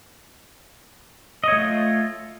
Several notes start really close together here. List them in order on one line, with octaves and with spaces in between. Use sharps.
D#5 C#5 A3 F4